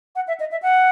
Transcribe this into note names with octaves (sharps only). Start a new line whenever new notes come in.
F#5
E5
D#5
E5
F#5